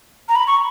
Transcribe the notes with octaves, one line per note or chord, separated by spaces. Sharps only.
A#5
B5
C#6